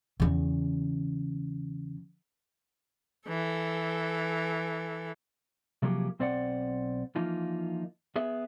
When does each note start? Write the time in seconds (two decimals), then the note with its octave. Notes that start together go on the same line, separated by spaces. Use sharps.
0.20 E2 C#3
3.28 E3 A4
5.82 C3 F3 F#3 A#3 G4 G#4
6.19 B1 C4 C5 D5 F5 F#5
7.16 E3 F3 A#3 D#4 F4
8.16 B3 G#4 E5